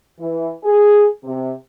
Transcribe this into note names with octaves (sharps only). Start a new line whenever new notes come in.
E3
G#4
C3